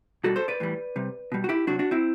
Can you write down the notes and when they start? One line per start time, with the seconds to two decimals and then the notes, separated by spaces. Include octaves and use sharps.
0.24 B2 G3 F#4 A4
0.36 A4 C5
0.48 B4 D5
0.60 A2 E3 G3
0.96 C3 G3
1.32 B2 G3
1.44 F#4
1.49 E4 G4
1.67 C3 F#3 D4 F#4
1.79 D4 F#4
1.91 C4 E4